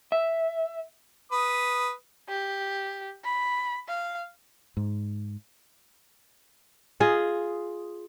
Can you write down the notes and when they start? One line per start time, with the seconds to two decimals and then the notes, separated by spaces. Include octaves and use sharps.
0.12 E5
1.32 B4 D#6
2.29 G4
3.24 B5
3.88 F5
4.77 G#2
7.00 F4 G#4 D#5